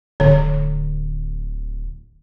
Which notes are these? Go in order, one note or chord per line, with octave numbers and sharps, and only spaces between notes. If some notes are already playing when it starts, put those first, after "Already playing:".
D1 D3 C#5